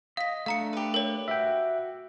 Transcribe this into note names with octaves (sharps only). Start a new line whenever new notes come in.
D#5 F5 B6
A3 D4 F5 A#5 C#7
G4 B4
A#4 C#5
F#4 E5 G5